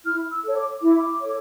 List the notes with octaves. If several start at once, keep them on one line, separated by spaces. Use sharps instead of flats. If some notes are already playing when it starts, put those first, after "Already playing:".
E4 F6
E6
A4 C#5
D6
E4 D6
A4 C#5